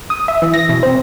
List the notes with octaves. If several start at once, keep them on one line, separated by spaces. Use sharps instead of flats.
D#6
E5
E3
A#6
B2
C4